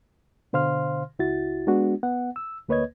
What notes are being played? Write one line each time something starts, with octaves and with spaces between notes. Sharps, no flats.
B2 D3 C5 F5 C6 F6
C#2 E4 F#4 A6
G#3 B3 D4 F#4
B3 F#5
E6
D2 A#3 B4 C#5 D#5 G#6